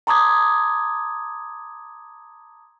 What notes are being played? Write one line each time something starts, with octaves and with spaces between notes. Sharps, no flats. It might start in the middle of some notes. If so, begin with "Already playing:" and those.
A5 A#5 C6 D6 D#6 G#6